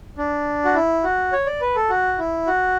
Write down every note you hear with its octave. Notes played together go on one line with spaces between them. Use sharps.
D4
F#4
E4
F#4
C#5
D5
B4
A4
F#4
E4
F#4